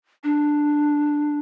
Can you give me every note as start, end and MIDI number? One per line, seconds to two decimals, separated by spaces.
0.24 1.39 62